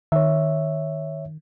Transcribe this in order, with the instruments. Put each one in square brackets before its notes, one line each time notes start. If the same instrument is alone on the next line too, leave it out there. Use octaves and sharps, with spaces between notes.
[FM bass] D#3 [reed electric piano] C#5 E5